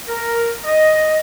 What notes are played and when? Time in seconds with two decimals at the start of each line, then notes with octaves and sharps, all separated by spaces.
0.08 A#4
0.64 D#5